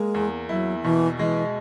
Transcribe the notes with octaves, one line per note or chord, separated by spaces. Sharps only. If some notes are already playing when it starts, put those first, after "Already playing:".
Already playing: G#3 A#3
E2
F#3 E4
B2 E3
E3 G#3